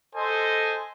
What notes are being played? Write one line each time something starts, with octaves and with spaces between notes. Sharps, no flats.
A4 C5 D#5 G#5